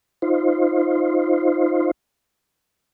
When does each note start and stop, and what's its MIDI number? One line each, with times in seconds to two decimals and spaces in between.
0.22 1.91 63
0.22 1.91 65
0.22 1.91 72